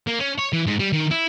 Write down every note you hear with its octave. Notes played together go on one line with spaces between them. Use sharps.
A#3
C#4
C#5
E3
G#2
G3
D#3
E4